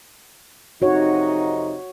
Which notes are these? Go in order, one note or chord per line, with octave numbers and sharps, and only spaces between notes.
F2 C3 D#4 F#4 C#5